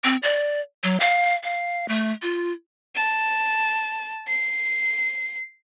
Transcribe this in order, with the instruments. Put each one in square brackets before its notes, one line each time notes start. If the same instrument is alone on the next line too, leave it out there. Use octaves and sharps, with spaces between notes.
[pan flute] C4
D5
F#3
F5
F5
A3
F4
[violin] A5
C7